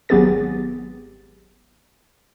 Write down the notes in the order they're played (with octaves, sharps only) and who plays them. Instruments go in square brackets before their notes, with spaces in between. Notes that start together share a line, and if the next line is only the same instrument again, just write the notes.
[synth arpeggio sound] G#1 F#3 B3 G4 G#4 A6